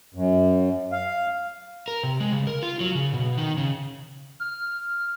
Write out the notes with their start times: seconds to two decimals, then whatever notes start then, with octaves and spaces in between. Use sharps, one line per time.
0.14 F#2
0.92 F5
1.88 A#4
2.03 C3
2.20 G#3
2.32 C#3
2.47 A#4
2.63 F4
2.80 F#3
2.95 C#3
3.14 B2
3.38 D#3
3.57 C#3
4.40 F6